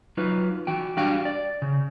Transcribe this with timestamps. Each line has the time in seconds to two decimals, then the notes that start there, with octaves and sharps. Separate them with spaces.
0.17 F#3 D#4 F4 B4
0.67 E3 F#4 G5
0.97 G3 D4 F#4 F5 G5
1.25 D5
1.62 C#3